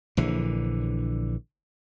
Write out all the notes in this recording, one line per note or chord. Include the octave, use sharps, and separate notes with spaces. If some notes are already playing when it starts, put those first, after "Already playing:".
A#1 D3 E3